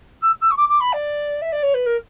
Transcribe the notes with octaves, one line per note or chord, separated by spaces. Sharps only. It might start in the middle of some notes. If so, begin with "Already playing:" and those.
E6
E6
C#6
D6
D6
B5
D5
E5
D5
C#5
B4
A#4